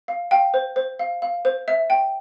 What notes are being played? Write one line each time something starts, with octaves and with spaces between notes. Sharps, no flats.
F5
F5 G5
C5
C5
F5
F5
C5
E5
G5